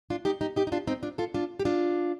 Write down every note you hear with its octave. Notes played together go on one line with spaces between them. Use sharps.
D4 F4
D#4 G4
D#4 G4
D#4 G4
D#4
D4 F4
C4 D#4
D4 F4
F4 A4
D4 F4
G4
D4 F4